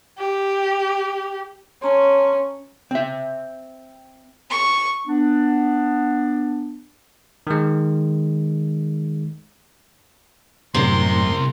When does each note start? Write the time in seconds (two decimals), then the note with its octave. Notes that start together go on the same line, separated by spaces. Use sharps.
0.18 G4
1.82 C#4 A5 A#5 C6
2.91 C4 E5
4.50 C#6
5.05 B3 D4
7.47 D#3 G#3
10.74 C2 F#2 A2 C3 A#4 C6